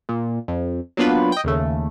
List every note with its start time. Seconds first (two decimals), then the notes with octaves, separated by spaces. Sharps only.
0.09 A#2
0.48 F2
0.97 F#3 A#3 B3 D4 F4 B4
1.32 D#5 G5
1.44 D#2 C#3 A3